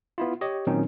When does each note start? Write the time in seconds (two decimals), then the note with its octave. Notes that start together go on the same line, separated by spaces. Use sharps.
0.18 B3 E4 F4
0.41 G4 C#5 D#5
0.67 A#2 D#3 F#3 C4 C#4 D#4